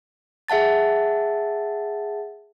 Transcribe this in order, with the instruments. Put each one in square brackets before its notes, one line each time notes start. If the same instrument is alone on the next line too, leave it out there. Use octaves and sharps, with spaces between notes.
[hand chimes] G#4 E5 F#5 A5 A6